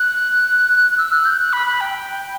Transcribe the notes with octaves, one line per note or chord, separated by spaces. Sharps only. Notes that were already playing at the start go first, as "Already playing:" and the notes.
Already playing: F#6
E6
F#6
G6
F#6
B5
B5
G5